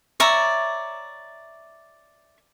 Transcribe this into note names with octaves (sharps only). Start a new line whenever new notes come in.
C#5 D5 E5 A#5